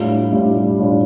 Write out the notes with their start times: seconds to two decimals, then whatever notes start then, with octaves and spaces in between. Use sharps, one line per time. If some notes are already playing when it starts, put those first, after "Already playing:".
Already playing: A2 G3 D4 F4
0.33 A2 G3 D4 F4
0.79 A2 G3 D4 F4